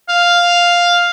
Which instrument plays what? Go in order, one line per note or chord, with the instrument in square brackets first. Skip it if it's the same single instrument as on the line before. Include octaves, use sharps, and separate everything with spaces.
[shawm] F5